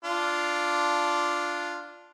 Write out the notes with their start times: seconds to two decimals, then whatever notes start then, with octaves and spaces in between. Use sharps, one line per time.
0.05 D4 F4